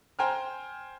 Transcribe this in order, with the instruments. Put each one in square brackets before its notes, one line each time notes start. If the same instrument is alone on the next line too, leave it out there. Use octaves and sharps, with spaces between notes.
[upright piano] C5 G5 G#5 A#5 F6